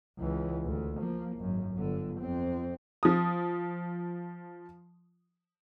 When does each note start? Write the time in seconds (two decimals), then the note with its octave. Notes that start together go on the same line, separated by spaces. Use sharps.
0.18 C#2 E3
0.65 D2
0.99 F3 A#3
1.37 G#1 F#2
1.76 G1 D3
2.20 F2 C4
3.03 F3 D#6